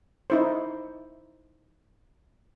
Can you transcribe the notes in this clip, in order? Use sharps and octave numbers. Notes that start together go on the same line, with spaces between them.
D#4 E4 C5